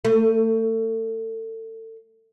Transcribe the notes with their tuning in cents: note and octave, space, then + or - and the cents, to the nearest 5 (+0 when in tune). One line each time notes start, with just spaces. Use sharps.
A3 +30